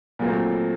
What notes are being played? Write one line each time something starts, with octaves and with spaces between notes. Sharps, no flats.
A#2 F#3 A3 C4